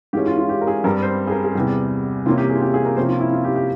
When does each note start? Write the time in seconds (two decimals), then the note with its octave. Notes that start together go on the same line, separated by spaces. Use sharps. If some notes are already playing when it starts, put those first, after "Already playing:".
0.13 G#2 E3 G#3 C#4 G4
0.26 F4
0.38 F4
0.49 G4
0.61 A#4
0.67 G#4
0.84 G2 G3 C4 A#4
1.02 C5
1.27 G#4
1.32 A#4
1.44 G#4
1.55 E2 C3 G3
2.26 C3 E3 A#3 C#4 F4
2.38 G4
2.50 G#4
2.55 F4
2.61 G4
2.74 G#4
2.85 A#4
2.96 C3 F3 A#3 C#4 C5
3.08 F4
3.20 E4
3.32 F4
3.44 G4
3.55 G4